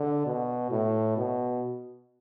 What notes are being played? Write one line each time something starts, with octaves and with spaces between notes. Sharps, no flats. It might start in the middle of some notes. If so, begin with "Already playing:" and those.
Already playing: D3
B2
A2
B2